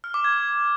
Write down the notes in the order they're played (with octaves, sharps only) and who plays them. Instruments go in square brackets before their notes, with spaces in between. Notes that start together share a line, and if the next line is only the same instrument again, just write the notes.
[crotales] F6
D6
G#6